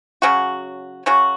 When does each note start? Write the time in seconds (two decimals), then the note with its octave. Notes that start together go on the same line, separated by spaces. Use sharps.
0.22 C#3 F#3 C#4 F#4
1.06 C#3 F#3 C#4 F#4